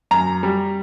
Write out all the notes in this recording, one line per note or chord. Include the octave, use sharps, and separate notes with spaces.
F#2 A#5
G3